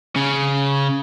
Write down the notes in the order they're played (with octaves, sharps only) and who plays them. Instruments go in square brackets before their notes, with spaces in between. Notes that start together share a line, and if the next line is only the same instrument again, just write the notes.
[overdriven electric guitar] C#3